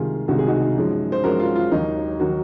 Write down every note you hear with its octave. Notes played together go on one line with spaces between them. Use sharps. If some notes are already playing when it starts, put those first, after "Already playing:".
Already playing: C2 C3 D#3 G#3 F4 G#4
C2 C3 D#3 G#3 F#4
G#4
D#4 F#4
F#2 F3 G#3
C5
F#2 F3 G#3 F#4 A#4
F4
F4
D#2 D#3 F#3 D#4
D#3 F#3 F#4 A#4